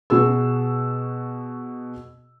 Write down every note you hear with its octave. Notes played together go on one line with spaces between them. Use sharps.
B2 F#4 G#4 E6